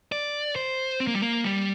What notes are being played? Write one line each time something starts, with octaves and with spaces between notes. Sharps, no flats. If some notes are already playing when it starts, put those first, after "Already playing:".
D5
C5
C4
A#3
G3
A#3
G3